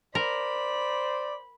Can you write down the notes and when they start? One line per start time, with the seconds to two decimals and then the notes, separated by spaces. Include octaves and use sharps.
0.15 A#4 C5 D5 B5